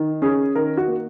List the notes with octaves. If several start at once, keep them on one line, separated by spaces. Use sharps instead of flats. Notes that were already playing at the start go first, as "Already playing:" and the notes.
Already playing: D#3
C#4 G#4
D#3 A#4
F#4
A#3